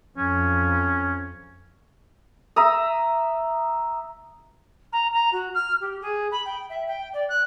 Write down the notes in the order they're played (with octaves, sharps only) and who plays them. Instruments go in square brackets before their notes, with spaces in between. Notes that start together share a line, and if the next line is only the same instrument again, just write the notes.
[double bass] F2 [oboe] C#4
[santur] E5 A#5 D#6
[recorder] A#5
A#5
F#4
F6
G4
G#4
B5
G5
E5
G5
D5
F#6